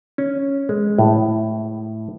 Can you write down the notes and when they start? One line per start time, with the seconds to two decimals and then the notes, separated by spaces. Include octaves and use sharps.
0.18 C#4
0.69 G#3
0.98 A2